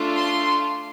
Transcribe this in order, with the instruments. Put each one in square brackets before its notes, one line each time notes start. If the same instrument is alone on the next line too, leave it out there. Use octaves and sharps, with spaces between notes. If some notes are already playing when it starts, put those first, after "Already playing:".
Already playing: [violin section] A3 D4 F4 A4
C6